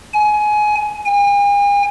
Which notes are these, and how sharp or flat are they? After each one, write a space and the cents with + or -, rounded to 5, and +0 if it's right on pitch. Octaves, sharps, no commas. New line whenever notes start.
G#5 +20
G#5 -45